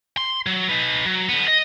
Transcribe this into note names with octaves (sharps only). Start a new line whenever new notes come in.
C6
F#3
D#4 B4
F#3
D3 B3
D#5